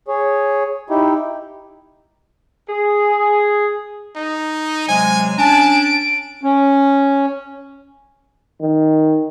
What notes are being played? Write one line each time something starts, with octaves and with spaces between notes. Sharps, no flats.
G#4 C#5
D#4 E4 G4
G#4
D#4
C3 F#3 G#3 G#5
C#4 D4 G#5 A5 D7
C#4
D#3